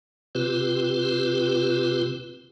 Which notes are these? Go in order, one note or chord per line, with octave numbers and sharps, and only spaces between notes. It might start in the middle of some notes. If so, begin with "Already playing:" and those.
C3 C4 F4 G4 B4